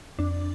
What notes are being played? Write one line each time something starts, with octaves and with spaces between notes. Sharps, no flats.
F2 D4